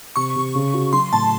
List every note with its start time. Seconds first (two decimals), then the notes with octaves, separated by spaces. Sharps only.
0.16 C3 C#6
0.36 C3
0.55 C#3
0.74 F#4
0.93 F#3 C6
1.13 A2 A5